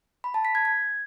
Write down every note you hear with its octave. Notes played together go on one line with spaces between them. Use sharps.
B5
A5
B6
G#6
G#6